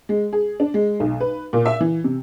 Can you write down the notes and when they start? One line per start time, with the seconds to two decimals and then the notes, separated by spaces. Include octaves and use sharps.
0.09 G#3
0.33 G#4
0.60 D4
0.74 G#3
1.00 B1
1.20 B4
1.53 A#2
1.66 E5
1.81 E3
2.04 C3